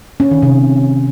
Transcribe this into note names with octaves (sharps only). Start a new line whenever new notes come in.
C#4
D#3
C3